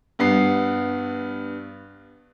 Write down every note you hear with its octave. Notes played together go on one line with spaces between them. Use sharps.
G2 B3 C7